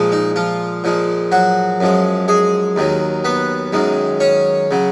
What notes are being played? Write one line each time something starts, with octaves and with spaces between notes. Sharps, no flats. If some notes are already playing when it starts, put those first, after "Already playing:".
Already playing: A#2 F3 G#3
D#4
F3 F4
A#2 F3 G#3
F#3 F#4
F#2 F3 G#3
G#3 G#4
D#2 D#3 F#3
B3 B4
F#2 D#3 G#3
C#4 C#5
C#3 F#3